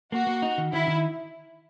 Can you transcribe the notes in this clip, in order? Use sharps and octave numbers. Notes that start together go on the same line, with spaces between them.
A#3 F#4
A#3
D#4
D#3
D#3 E4
D#3